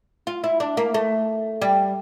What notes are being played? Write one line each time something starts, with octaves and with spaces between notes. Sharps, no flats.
F4
E4
D4
A#3
A3
G3